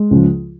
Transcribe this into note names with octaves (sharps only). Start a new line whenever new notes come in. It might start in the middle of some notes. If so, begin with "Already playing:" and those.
Already playing: G#3
C#2 C#3 F3